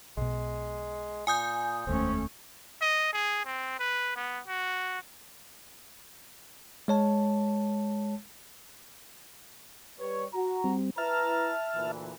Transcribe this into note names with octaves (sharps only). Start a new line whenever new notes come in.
B1 B2 G#3
A#2 G#5 D#6 G6
F1 D#2 G#3 A3 C4 C#4
D#5
G#4
C4
B4
B3
F#4
G#3 C#5 A5
G3 B4 C#5
F#4 A#5
G3 C4
E4 B4 E5 A5 A#5 F6
D2 A#2 E3